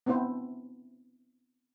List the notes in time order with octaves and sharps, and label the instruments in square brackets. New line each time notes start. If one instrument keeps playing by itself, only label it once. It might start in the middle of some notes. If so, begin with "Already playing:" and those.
[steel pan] B3 C4 D4 E4 C5